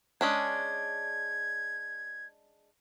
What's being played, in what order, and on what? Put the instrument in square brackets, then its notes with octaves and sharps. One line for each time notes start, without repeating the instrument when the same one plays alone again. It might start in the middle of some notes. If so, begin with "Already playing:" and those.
[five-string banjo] G#3 C#4 D4 [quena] G#6